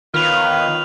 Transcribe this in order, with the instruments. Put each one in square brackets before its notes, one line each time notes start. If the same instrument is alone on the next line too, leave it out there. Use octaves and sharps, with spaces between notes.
[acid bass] D#3 [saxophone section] B3 F4 [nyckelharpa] B4 C#5 [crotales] F6 F7